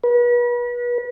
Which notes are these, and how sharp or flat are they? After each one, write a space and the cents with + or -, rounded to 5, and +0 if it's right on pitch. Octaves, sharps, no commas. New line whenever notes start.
B4 -35